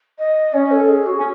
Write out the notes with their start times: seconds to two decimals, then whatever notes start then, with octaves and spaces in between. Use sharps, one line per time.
0.19 D#5
0.53 C#4 C#5
0.71 A4
0.89 G#4
1.06 F#4
1.19 C#4